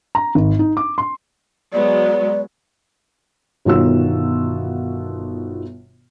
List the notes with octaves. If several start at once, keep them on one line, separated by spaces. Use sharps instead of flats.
A#5
G#1
D#4
D6
C6
F#3 G#3 B3 D5
G1 B2 D#3 F4 F#4 E6